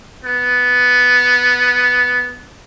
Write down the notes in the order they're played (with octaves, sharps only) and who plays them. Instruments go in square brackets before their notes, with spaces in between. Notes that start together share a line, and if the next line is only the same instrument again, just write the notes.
[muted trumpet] B3